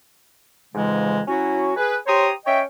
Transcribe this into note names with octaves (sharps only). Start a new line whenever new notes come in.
F2 G#2 C#3 E3 G#3
F#3 C#4 E4 F#4
G#4 B4
G4 C5 C#5 A#5 C6 D#6
C#4 C#5 D#5 E5 G5